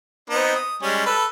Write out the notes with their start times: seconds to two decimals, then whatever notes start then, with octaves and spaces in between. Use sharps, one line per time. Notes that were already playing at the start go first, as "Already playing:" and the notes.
0.30 B3 C4 D#4
0.56 D#6
0.82 G3 G#3 C#4
1.07 A4 B4